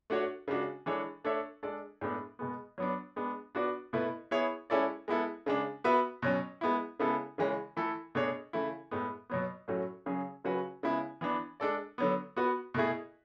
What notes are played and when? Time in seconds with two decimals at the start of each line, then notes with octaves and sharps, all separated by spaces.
0.10 A3 D4 F#4 C#5
0.48 C#3 G#3 D4 F#4
0.86 E3 G#3 D4 A4 C#5
1.24 A3 D4 A4 C#5 E5
1.63 G#3 D4 A4 D5
2.01 A2 G#3 B3 D4
2.39 B2 G#3 B3
2.78 F#3 B3 D4
3.16 G#3 B3 D4
3.55 B3 D4 F#4 B4 D5
3.93 B2 A3 E4 B4
4.31 B3 E4 G#4 C#5 E5
4.70 G#3 C#4 E4 A4 D5
5.08 G#3 B3 E4 A4
5.46 C#3 G#3 D4
5.84 B3 F#4 B4 E5
6.22 B2 F#3 C#4
6.61 G#3 B3 E4
6.99 C#3 G#3 B3 E4 A4
7.38 C#3 E3 G#3 C#4
7.76 E3 A3 E4 A4
8.15 B2 A3 D4 G#4 C#5
8.53 C#3 E3 A3 E4
8.91 A2 G#3 B3
9.30 B2 F#3 B3
9.68 A2 F#3 A3 C#4 F#4
10.06 C#3 F#3 C#4 G#4
10.44 C#3 F#3 C#4 F#4 B4
10.83 C#3 G#3 B3 E4
11.21 E3 B3 D4
11.60 G#3 D4 A4 D5
11.98 D3 F#3 B3
12.36 B3 F#4 B4
12.74 B2 A3 E4 G#4